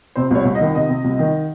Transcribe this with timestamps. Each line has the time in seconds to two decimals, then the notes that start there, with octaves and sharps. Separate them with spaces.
0.16 C3 C5
0.31 C2 C#5
0.45 C2
0.55 D#5
0.61 D#3
0.75 C3 D#5
0.89 C3
1.04 C2
1.19 D#3